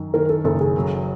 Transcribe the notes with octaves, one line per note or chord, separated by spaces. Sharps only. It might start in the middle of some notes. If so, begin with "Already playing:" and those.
Already playing: F#2 D#3
D#3 A#4
A4
F#1 A4
G#4
F#3